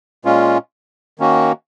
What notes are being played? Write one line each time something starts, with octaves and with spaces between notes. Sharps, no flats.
A#2 G#3 C#4 F4
D#3 A#3 C#4 F#4